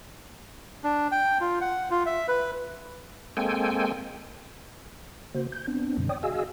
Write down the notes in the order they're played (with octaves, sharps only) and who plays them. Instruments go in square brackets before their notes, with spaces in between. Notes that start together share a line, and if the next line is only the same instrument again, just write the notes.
[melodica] D4
G5
F4
F#5
F4
E5
B4
[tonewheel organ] G#3 A#3 C4 A4 G5 G#5
C#3 A#3 F#4 C5
G6
B3 C4 D4
F#2 B2 D3 G3
C#5 D5 G5 D#6
F#4 G#4 D#5 F5 G#5 E6